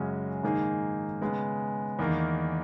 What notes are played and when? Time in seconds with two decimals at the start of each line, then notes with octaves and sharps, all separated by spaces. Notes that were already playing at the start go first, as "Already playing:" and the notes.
Already playing: F#2 C#3 G#3 C#4 F#4
0.43 G#2 D#3 A#3 D#4 G#4
1.22 C#3 G#3 B3
1.99 E2 D#3 A#3